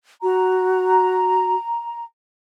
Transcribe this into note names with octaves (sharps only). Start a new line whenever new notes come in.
F#4 A#5